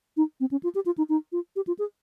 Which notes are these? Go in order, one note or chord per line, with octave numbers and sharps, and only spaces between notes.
D#4
C4
C#4
F4
G4
F4
D#4
D#4
F4
G4
F4
G#4